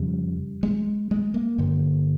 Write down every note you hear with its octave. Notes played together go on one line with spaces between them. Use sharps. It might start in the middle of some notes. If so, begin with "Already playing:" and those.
Already playing: F2 C#3 G3
G#3
G#3
A#3
G2 D3